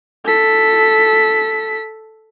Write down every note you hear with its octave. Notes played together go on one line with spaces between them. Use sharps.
A4 B6